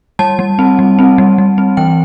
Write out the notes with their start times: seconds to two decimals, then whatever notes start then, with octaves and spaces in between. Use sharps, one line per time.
0.19 G3 A5
0.39 G3
0.59 C4
0.79 G3
0.99 C4
1.18 G3
1.38 G3
1.58 C4
1.77 E3 G5